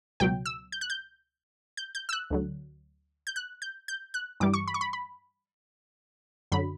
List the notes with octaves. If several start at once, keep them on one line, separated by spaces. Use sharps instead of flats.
C#2 B2 F#3 G5
E6
G6
F#6
G6
G6
G6
E6
F#6
D2 D3 F#3
G6
F#6
G6
G6
F#6
G2 E3 G3 D6
C#6
B5
C#6
B5
B5
F#2 D3 F#3 B5